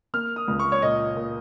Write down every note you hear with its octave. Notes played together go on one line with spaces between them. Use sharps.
A#3 F6
D#6
C#2
C#6
C#5
A#2 D#5
A#2